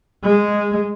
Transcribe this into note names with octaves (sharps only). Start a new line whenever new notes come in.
G#3